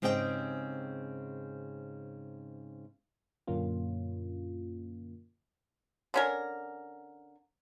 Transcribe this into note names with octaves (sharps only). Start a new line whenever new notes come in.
G#2 C#3 C4 G4 D#5 G5
F#2 A#2 D3 A#3 C#4 F4
D3 C#4 A#4